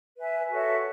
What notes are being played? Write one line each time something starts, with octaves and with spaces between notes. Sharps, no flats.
B4 E5 G#5
F#4 A4 C#5 E5